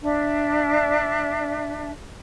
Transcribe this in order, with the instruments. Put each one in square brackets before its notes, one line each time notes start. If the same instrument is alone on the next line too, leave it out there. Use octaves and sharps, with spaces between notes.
[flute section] D4 E5